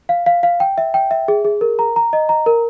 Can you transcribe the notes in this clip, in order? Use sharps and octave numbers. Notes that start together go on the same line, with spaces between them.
F5
F5
F5
G5
E5
G5
E5
G#4
G#4
A#4
A#5
A#5
D#5
A#5
A#4